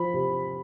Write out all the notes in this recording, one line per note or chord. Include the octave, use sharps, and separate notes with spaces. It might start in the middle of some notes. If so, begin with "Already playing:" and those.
Already playing: F3 B5
C3